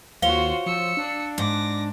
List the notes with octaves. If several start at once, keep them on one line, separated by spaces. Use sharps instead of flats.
D#2 F4 F#4 C5 C#5 F5 G7
F3 E6 C#7
D4
G#2 D6 A#6